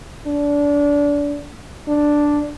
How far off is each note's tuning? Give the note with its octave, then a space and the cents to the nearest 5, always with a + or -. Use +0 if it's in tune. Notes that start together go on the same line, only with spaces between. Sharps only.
D4 -25
D4 +0